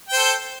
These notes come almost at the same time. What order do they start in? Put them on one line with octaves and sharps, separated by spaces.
G5 C5 A4